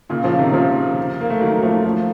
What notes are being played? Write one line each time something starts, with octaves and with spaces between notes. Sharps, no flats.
A#2 C#3
C#3 F3
C3 D#3
C#3 F3
A#3
A3
D#3 F#3
F3 A3
F3 A3